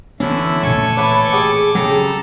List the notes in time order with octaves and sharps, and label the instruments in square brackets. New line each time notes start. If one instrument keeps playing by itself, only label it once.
[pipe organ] D3 E4 [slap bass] E3 B3 [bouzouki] C#4
[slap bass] A1 A#2 [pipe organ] A4 G#5 C#6
[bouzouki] E4 B4 C#5 [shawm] D6
[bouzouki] G4 G#4
[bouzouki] C#3 C#4 G4 [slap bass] F#3 [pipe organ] A4 A#5